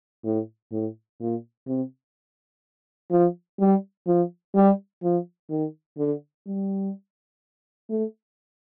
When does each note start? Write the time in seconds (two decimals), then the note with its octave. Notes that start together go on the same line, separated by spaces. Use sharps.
0.25 A2
0.72 A2
1.20 A#2
1.67 C3
3.11 F3
3.59 G3
4.07 F3
4.55 G3
5.03 F3
5.50 D#3
5.98 D3
6.47 G3
7.90 A3